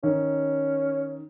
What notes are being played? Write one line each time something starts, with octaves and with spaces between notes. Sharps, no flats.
D#3 C#4